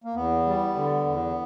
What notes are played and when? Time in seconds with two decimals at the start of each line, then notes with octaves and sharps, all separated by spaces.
0.04 A#3
0.15 E2 B3
0.46 G3
0.76 D3
1.06 E2